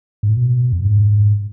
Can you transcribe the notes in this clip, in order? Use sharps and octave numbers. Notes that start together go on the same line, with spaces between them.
G#2
A2
B2
F2
G#2